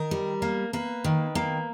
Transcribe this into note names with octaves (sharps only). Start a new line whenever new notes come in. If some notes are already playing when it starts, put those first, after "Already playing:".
Already playing: D#3 A#4
G3
A#3
A#3 B4
D#3
A#3